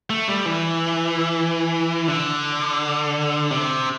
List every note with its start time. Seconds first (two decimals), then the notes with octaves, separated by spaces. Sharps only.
0.10 A3
0.28 G3
0.46 E3
2.08 D3
3.51 C3